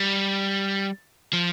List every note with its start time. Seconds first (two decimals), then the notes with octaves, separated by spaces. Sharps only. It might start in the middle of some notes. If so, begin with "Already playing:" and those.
Already playing: G3
1.33 F3